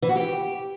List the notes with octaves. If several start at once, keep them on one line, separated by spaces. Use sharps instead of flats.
E3
F#4
G4